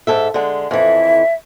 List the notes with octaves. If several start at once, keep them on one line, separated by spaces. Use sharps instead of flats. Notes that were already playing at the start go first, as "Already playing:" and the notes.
G#2 A4 E5
D3 G#3
F2 E3 E5